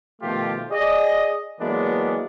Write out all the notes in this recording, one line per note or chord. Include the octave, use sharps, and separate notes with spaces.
B2 D#3 F3 A3 F4 G4
G#4 D5 D#5
E3 F#3 G#3 A#3 B3 D4